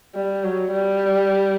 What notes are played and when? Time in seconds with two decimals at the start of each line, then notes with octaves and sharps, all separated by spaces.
0.15 G3
0.44 F#3
0.71 G3